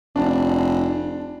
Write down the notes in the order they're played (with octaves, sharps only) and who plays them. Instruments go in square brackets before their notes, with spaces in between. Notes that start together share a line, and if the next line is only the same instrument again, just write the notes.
[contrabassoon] F1 [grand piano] D4